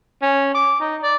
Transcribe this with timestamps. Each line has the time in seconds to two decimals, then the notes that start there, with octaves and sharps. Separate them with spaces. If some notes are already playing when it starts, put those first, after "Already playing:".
0.22 C#4
0.55 D6
0.80 D#4
1.03 D5